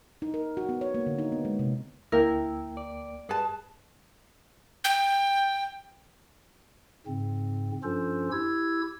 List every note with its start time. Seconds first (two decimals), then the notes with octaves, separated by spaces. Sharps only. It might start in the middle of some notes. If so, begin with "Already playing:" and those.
0.22 D#4
0.34 A#4
0.57 F#4
0.69 B3
0.81 C#5
0.94 A#3
1.06 D3
1.18 D#4
1.32 B3
1.45 G#3
1.59 C3
2.12 D2 A#3 E4 A#4 G5
2.77 D5
3.29 G2 G#4 B4 A5
4.84 G5
7.07 G#2 C#3 C4
7.84 G2 F3 C#4 F4 A4 C5
8.32 E4 G4 E6 G#6